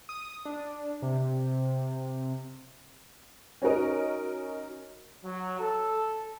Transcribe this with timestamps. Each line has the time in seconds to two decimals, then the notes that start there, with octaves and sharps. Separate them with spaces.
0.09 D#6
0.45 D4
1.02 C3
3.62 C#4 D#4 F#4 A#4 D#5
5.25 F#3
5.60 A4